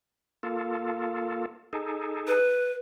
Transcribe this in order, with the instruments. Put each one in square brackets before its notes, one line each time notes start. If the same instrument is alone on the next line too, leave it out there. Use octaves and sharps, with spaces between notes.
[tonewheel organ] A#3 F4 A4
D#4 G#4 A4
[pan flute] B4